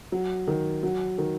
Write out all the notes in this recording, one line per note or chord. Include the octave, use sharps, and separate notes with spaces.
F#3
D#3
F#3
D#3